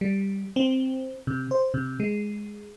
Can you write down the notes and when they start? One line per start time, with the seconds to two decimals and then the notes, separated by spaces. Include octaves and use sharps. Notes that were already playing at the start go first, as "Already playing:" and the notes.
0.01 G3
0.56 C4
1.27 C3
1.51 C5
1.74 C3
2.00 G#3